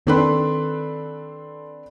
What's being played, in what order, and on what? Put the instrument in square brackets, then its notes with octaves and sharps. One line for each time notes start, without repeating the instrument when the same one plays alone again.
[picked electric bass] D#3 [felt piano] C4 D4 B4 [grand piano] A4 C6